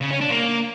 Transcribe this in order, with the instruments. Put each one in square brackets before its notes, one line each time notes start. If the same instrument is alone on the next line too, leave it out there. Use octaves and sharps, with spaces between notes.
[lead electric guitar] C#3
C#4
D4
A#3